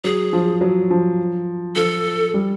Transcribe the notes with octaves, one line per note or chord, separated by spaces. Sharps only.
F#3 G#4
F3
F#3
F3
F3 A4
G3